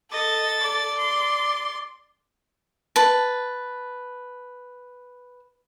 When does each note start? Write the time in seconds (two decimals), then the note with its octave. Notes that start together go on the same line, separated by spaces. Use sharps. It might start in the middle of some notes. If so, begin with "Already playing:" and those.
0.11 A4 D#5 A6
0.60 D5
0.98 C6
2.96 B4 A5